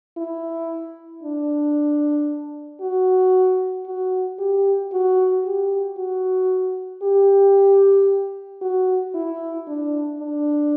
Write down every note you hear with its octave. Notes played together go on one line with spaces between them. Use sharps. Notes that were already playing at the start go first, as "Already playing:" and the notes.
E4
D4
F#4
F#4
G4
F#4
G4
F#4
G4
F#4
E4
D4
D4